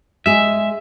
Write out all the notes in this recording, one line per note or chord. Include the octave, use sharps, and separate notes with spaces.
G#3 G#4 E5